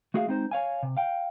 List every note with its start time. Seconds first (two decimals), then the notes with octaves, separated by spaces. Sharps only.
0.14 A3 F#4 G#4 E5 F5
0.27 G#3 C4 D#4 C5
0.51 C#5 F5 G#5
0.83 C3
0.97 F5 G5